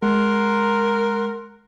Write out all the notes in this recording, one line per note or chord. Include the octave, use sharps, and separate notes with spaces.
G#3 A#4 F#5 A#5 C6